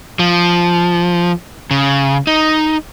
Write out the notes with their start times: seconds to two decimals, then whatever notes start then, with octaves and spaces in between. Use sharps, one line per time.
0.19 F3
1.71 C#3
2.27 D#4